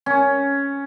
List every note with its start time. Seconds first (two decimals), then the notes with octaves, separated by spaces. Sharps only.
0.06 C#4